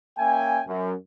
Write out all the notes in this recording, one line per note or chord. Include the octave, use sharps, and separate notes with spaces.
A#3 C#4 E5 G5 G#5
F#2